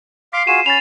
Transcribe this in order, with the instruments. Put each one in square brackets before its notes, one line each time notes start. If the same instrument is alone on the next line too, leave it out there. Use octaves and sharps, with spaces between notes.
[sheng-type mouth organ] F5 C6 D6 [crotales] B6 C7
[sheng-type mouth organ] F4 F#4 G#4 [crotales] D#7 E7
[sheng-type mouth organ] C#4 B5 [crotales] A6 F7